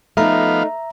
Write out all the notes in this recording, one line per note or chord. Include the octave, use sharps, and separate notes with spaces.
F3 A3 B3 D#4 E5 F5 A#5